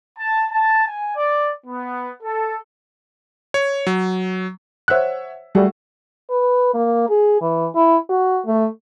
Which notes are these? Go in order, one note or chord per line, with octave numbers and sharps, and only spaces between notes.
A5
A5
G#5
D5
B3
A4
C#5
F#3
C5 C#5 E5 F#5 F#6
G3 A3 F#4 G#4
B4
A#3
G#4
E3
E4
F#4
A3